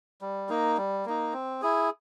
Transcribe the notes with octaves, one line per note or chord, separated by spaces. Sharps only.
G3
A#3 D#4
G3
A#3 D#4
C4
E4 G#4